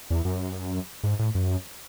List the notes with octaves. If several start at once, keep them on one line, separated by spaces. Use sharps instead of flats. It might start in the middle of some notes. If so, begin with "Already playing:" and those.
E2
F#2
G#2
A2
F#2